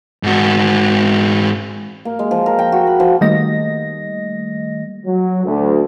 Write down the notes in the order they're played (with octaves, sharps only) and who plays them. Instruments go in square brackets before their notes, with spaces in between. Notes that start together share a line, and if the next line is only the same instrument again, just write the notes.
[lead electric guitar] G#2 F#4
[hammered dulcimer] A#3
G#3
F3
A#4
G5
F#4
B5
F3
[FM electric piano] D#3 G3 A3 A#3 D#5 A#6
[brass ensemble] F#3
D2